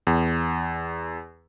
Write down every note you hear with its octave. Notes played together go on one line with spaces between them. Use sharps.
E2